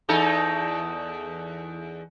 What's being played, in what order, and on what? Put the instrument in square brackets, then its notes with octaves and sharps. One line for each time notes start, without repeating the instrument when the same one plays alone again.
[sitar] E2 D#4 A4